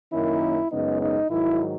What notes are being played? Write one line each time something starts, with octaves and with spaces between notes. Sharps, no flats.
F#2 D#3 A#3 C#4 E4
F#2 C#3 G#3 B3 D#4
D#4
G#2 D#3 F#3 E4